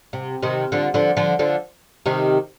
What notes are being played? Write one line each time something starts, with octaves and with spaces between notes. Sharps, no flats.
C3
C3 D#3
D3 F3
D3 F3
D3 F3
D3 F3
C3 D#3